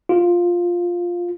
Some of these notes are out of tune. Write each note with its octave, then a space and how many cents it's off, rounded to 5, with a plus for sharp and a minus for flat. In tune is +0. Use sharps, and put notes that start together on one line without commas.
F4 +5